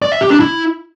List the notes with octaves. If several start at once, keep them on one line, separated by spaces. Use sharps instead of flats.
D5
E5
G4
D4
E4